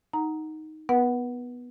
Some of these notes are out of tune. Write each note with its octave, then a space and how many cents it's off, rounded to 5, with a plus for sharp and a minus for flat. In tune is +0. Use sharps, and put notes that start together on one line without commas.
D#4 +5 F#5 +0 A#5 +0
B3 +0 B4 -30 F#5 +0